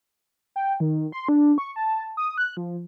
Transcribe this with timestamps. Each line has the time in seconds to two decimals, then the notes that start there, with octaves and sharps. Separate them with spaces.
0.56 G5
0.80 D#3
1.12 C6
1.29 D4
1.58 C#6
1.76 A5
2.17 D#6
2.38 F#6
2.57 F3